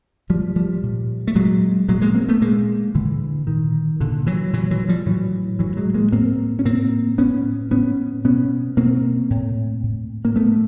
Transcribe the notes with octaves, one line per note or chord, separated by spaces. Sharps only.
A2 F3 G3
F3 G3
A#2
A3
A#2 F#3 G#3
A#2 F#3 G#3
G#3 A#3
A#3 C4
A3 B3
A#2 G#3 A#3
A#2 D3 E3
A#2 D#3
A#2 D3
E3 F#3
A#2 E3 F#3
E3 F#3
F3 G3
A2 E3 F#3
A2 E3 F#3
F#3 G#3
G#3 A#3
A2 A#3 C4
C#4
A2 A#3 C4
A2 B3 C#4
A2 B3 C#4
B2 B3 C#4
B2 A#3 C4
A2
A2
A#3
A2 A3 B3